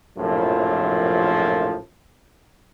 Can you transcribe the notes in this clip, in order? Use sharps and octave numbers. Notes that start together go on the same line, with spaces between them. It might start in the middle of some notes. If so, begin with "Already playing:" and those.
A#1 F#2 A2 C3 F3